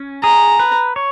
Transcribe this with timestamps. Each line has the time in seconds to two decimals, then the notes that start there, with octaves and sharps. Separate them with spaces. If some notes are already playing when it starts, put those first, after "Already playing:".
Already playing: C#4
0.23 G#4 A#5
0.59 B4
0.96 C#5